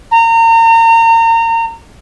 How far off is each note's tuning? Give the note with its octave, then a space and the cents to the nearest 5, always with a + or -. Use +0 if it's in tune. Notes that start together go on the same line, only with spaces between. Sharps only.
A#5 -35